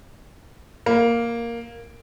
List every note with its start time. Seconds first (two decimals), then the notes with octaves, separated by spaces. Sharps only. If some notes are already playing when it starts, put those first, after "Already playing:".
0.86 A#3